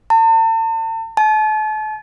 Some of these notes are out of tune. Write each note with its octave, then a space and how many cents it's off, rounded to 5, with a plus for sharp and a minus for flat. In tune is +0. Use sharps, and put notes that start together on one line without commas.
A5 +40
A5 -40